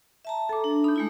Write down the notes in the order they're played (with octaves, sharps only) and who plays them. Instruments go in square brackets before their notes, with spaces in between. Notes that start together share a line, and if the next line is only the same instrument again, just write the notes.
[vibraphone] E5 A5 A#5
[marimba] A4 D6
[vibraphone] D4
[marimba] D#4 G6 [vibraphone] B5
[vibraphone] G#3 A3 E4